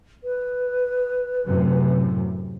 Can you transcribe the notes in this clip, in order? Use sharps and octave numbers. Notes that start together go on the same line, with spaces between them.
B4
F#2 A2 C3